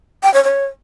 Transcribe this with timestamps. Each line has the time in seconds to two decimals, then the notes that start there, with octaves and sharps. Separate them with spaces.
0.23 G5
0.34 C#5
0.44 C#5